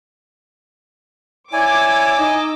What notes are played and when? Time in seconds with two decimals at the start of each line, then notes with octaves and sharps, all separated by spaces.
1.53 E4 C#5 D5 G#5 D6 E6
2.18 D#4 D#5